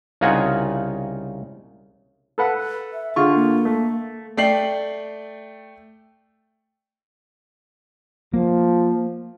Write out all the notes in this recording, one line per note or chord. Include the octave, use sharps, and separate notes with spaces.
C2 C#3 D#4 F4 F#5 G#5
A4 B4 F#5
E5
D3 F4 G#4 C#6
A#3
A3
A3 D5 G5 C7 F#7
F3 A#3